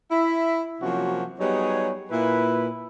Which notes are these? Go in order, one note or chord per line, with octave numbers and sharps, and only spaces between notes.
E4 E5
C3 F3 F#3 A#3 C#4 F#4
F#3 G3 B3 D#4 G#4 C#5
A#2 E4 B4